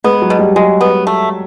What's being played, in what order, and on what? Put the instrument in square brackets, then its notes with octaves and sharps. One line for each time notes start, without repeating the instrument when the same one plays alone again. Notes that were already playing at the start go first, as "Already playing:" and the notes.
[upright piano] G#3 [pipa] B3
[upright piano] F#3
[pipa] B2
[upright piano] G3
[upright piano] F#3 [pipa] G#3
[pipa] B3
A3